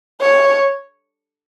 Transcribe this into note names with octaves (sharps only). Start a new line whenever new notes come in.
C#5